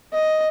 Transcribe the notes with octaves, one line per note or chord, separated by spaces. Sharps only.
D#5